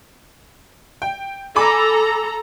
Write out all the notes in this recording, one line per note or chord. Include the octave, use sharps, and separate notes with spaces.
G5
A4 G#5 A#5 B5 D6